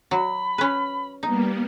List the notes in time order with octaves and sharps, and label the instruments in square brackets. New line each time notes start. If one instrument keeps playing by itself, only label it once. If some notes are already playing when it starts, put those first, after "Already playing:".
[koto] F#3 [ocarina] B5
[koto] C#4 B4
[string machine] G3 A#3 B3 [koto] D#4